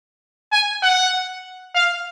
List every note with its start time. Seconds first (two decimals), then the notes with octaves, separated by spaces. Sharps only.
0.52 G#5
0.83 F#5
1.75 F5